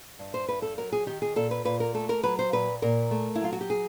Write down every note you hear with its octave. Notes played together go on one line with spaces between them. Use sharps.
G2
C5
G2 B4
A4
F#3 A#4
G#4
D#3 G4
G#4
A#2 A4
B4
A#2 B4
A#4
A3 A4
A#4
F#3 B4
C5
A#2 B4
A#2 A#4
A3
E4
F#3 F4
F#4
G4
G#4